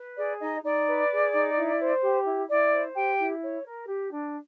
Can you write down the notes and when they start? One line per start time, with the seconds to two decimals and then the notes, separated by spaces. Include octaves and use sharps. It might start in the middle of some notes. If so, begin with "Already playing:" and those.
Already playing: B4
0.16 G#4 D5
0.39 D#4 D#5
0.62 D#4 D5
0.87 B4
1.10 G#4
1.32 D#4
1.55 E4
1.78 C5
2.02 G4
2.24 E4
2.48 E4 D5
2.71 C5
2.94 G4 G5
3.18 E4
3.41 C#5
3.64 A#4
3.87 G4
4.10 D4